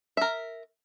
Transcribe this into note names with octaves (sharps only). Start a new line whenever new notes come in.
A#4 E5